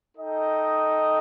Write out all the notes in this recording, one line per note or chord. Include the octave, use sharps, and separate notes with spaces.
D#4 A4 D#5 G5